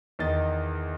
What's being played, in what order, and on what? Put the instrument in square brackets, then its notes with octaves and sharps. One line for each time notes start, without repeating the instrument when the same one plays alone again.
[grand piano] E2 D#3 D#5 A6